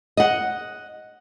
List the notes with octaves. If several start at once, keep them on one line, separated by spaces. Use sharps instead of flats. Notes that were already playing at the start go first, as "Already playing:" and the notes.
D#5 F#5